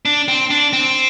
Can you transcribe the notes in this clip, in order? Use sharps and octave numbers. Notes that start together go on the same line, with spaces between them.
D4
C4
D4
C4